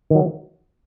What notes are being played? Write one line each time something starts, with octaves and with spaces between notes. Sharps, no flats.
D#3 F#3